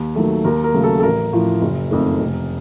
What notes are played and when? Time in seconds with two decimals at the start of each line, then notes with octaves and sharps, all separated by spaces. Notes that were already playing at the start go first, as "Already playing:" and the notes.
Already playing: D#2
0.15 D#3 F#3 A3
0.44 D#2 A#4
0.64 A#4
0.74 C#3 F#3 A3
0.84 A4
0.99 A4
1.03 A1 A#4
1.33 A2 F3
1.61 F#1
1.91 F2 D#3 A3
2.20 F1